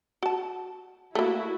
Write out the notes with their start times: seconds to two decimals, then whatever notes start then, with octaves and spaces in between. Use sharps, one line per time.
0.23 F#4 A5
1.15 A3 A#3 E4 F#4